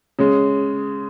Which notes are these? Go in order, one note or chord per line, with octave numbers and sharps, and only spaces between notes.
C#3 G#3